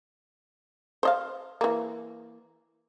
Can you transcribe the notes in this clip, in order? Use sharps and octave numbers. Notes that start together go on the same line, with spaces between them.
C5 D#5 F5
E3 A#3